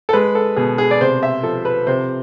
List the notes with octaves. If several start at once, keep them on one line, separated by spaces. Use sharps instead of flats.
A4
G#3 B4
A4
B2 G#4
G#4
D5
C3 C5
E5
F3 A4
B4
C3 C5